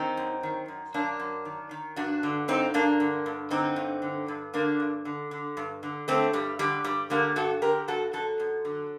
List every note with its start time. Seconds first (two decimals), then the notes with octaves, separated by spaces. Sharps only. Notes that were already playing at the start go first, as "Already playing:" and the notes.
Already playing: D#3 C4 D#4
0.17 F#2
0.43 D#3
0.68 F#2
0.94 F#2 A#3 D4
1.19 F#2
1.45 D#3
1.71 D#3
1.96 G2 D4 F#4
2.23 D3
2.48 G2 C4 D#4
2.74 G2 A#3 D4
3.00 D3
3.26 G2
3.50 D3 C4 D#4
3.76 G2
4.02 D3
4.28 G2
4.54 D3 A#3 D4
4.80 G2
5.05 D3
5.31 D3
5.57 G2
5.83 D3
6.08 D3 A3 C4
6.33 G2 G3
6.59 D3 G3
6.85 G2 G3
7.10 D3 G3 A#3
7.36 G2 F#4 A4
7.62 D3 G4 A#4
7.88 G2 F#4 A4
8.13 F#2 F#4 A4
8.40 F#2
8.65 D3